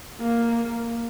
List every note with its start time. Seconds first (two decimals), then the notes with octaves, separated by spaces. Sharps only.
0.21 A#3